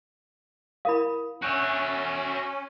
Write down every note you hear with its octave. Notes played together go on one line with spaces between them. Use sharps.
E4 A#4 F5 B5 D#6
C#4 F#4 E5 F#6 G6 D7